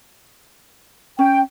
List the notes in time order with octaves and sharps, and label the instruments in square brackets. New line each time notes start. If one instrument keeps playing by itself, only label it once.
[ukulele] C#4 [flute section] G5